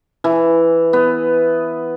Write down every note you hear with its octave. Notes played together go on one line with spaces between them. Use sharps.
E3
B3